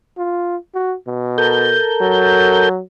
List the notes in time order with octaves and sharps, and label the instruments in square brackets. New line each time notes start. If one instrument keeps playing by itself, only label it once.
[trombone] F4
F#4
B2
[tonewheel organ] A4 A#4 G6
[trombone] F#3